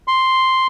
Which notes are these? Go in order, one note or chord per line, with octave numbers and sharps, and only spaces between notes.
C6